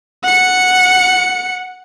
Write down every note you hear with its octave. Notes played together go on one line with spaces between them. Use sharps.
F#5 C#7